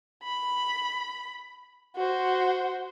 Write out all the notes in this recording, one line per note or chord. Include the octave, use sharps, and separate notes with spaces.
B5
F#4 C5